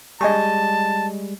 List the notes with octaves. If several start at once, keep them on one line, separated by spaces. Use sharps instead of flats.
G3 G#3 D#5 G#5 A5 C#6